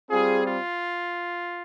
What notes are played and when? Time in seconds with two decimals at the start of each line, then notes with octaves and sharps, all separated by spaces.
0.10 G3 C4 F4 G#4
0.43 F4